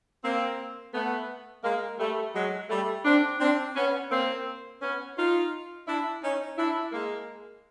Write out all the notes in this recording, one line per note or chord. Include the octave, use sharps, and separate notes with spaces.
A#3 C4
A3 B3
G#3 A#3
G3 A3
F#3 G#3
G3 A3
C4 D4
C4 D4
B3 C#4
A#3 C4
B3 C#4
D#4 F4
D4 E4
C#4 D#4
D4 E4
G#3 A#3